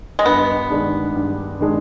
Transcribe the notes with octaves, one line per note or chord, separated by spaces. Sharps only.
G#3
G2 B3
D#3 G#3 D4
G2
D#3 G#3 D4